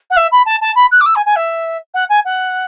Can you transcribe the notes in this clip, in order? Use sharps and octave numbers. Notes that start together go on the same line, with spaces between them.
F#5
E5
B5
A5
A5
B5
F#6
D6
E6
G#5
G#5
E5
F#5
G#5
F#5